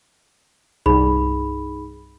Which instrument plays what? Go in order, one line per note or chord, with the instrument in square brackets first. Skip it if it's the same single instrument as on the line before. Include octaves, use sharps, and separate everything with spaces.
[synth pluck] C2 G2 [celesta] D#4 G#4 B5